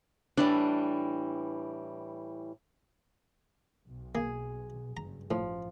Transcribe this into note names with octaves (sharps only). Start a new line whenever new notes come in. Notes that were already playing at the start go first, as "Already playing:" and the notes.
A2 E3 G3 D4
B1
A#3 G#4
F#1 G2 A#5
A1 A2 F3